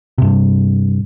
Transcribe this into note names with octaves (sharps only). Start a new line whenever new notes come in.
G2 C3